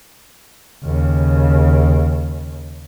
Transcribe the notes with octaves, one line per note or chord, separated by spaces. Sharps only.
D#2 C#3